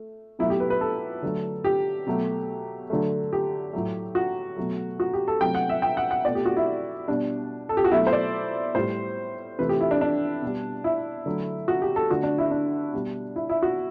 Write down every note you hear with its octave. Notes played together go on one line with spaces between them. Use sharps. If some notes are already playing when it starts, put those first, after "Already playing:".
Already playing: A3
B2 F#3 A3 E4
G4
B4
B4
A4
D3 F#3 A3
G4
B2 F#3 A3
D3 F#3 A3
G4
A2 F#3 A3
F#4
B2 F#3 A3
F#4
G4
A4
C3 F#3 A3 G5
F#5
E5
G5
F#5
F#5
B2 A3 D5
G4
F#4
E4
B2 G3 D4
A4
G4
F#4
B2 F#3 A3 E4
C5
D5
A2 G3 C5
C3 E3 A3 B4
G4
E4
D4
D4
B2 G3
E4
D3 F#3 A3
F#4
G4
A4
D3 A3 F#4
D4
E4
D4
B2 G3
E4
E4
F#4